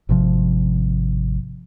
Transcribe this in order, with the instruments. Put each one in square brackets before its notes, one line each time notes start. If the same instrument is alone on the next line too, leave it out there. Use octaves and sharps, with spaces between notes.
[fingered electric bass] G#1 C3 F3